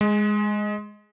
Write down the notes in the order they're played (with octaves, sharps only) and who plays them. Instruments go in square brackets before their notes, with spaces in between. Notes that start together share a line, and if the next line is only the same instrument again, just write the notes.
[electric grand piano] G#3